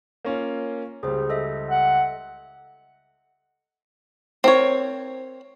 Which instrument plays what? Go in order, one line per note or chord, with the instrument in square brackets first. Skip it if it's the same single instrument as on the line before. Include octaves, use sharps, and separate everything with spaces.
[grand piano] A#3 C#4 F4
[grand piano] C#2 G3 [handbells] G#4 C5
[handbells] A4 D#5 E5
[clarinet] F#5
[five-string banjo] C4 A#4 C#5